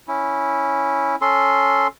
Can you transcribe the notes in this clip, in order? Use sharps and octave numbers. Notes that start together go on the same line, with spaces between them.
C#4 E4
C#4 A4 C6